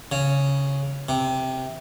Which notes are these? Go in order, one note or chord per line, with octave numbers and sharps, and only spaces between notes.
C#3
C3